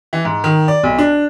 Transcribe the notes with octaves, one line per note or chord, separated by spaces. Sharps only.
E3
G#2
D#3
D5
B1
D4